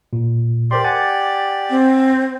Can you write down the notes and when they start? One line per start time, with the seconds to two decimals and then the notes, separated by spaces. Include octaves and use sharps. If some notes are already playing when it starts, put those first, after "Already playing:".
0.13 A#2
0.71 G4 A#4 C5 D5 C6
0.84 F#5 G#5 A6
1.70 C4